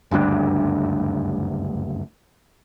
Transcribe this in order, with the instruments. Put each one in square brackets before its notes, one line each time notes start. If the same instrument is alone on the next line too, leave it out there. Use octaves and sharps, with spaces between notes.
[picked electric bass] F#1 D2 G2 D4